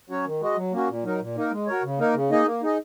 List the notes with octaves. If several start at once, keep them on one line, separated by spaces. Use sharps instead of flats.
F#3 C#4 F#4 C#5
D#3
G#3 F#4 D#5
F#3
A#3 C#4 F#4
A#2
F#3 D#4 A#4
A#2
A#3 D#4 A#4
G#3
F#4 A#4 C#5
C#3
A#3 D#4 A#4
C#3
A#3 D#4 G#4 D#5
A#3
D#4 G#4 D#5